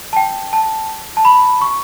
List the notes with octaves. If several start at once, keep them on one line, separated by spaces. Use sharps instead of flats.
A5
G5
A5
A5
B5
C#6